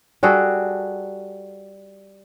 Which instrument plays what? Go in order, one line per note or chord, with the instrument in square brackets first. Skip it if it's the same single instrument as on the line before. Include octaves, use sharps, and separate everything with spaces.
[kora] G3 F#4 G#4 A4